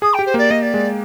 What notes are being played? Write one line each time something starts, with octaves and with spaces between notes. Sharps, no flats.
G#4 D#6
G5
G4
C5
A#3
D5
A#3 D#5
D5
G#3